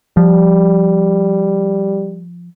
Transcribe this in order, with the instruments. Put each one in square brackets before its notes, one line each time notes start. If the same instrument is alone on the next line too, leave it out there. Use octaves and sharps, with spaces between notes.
[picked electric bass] F3 [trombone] G3